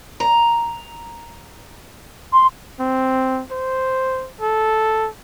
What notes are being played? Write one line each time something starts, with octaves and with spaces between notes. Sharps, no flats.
A#5
C6
C4
C5
A4